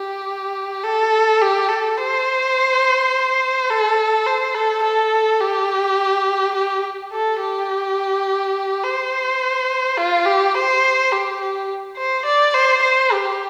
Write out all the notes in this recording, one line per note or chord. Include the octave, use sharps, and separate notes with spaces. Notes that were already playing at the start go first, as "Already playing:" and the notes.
Already playing: G4
A4
G4
A4
C5
A4
C5
A4
A4
G4
G4
A4
G4
C5
F4
G4
C5
G4
G4
C5
D5
C5
C5
G4